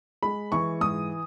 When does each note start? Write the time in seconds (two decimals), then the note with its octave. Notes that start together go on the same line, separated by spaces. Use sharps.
0.23 G#3 B5
0.52 E3 C#6
0.81 G#2 D#6